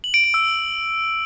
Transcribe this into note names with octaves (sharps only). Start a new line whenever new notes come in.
F#7
D7
D7
E6